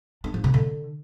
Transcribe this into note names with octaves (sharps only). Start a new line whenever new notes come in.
D4
F3
C#3
D3